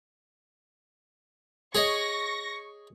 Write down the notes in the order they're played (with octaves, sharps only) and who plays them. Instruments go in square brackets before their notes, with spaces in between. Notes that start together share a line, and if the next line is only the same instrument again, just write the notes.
[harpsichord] G#4 C#5 D#5 [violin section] C#6 A#6